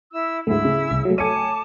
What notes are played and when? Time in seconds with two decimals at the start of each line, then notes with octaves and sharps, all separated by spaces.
0.12 E4 E6
0.47 D2 G#2 A3 E4 E6
0.64 C#3
0.92 C2
1.05 F#3 A3
1.18 A3 C#5 G#5 A5 D6 C#7 D#7